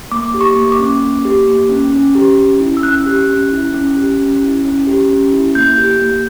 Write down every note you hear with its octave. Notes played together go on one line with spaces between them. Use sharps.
A#3 D6
G4
C#6
A#3
D6
C#4
A#3
G4
A#3
C#4
C#4
G4
C#4
E4
E6
C#4 F#6
G4
C#4
E4
C#4
G4
C#4
E4
C#4
G4
C#4
E4
A#3 G6
G4
A#3